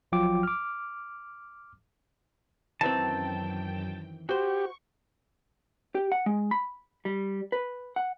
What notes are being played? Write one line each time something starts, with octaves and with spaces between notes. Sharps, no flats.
A1 F3 F#3 F4 G5 D6
D6 F6
F#2 D#3 E3 C4 G5 A5
F#4 G4 C5 C#6
G4
F#5
G#3
B5
G3
B4
F#5